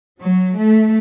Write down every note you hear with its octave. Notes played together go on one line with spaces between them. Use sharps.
F#3
A3